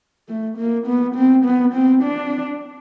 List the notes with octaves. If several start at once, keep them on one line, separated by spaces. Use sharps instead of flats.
A3
A#3
B3
C4
B3
C4
D4